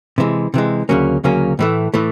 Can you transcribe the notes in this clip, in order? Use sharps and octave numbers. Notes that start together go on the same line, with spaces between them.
C3 E3 G#3
C3 E3 G#3
D2 C#3 F#3 A#3 C#4
D2 C#3 F#3 A#3 C#4
A2 E3 A3
A2 E3 A3